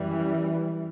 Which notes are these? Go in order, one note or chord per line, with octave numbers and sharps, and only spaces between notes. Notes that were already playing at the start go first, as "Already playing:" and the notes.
Already playing: F#2 E3 G3